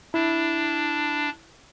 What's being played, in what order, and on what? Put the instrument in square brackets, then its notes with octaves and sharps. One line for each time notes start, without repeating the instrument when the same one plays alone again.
[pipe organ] D4 [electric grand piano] E4